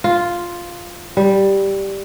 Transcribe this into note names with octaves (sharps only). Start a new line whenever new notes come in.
F4
G3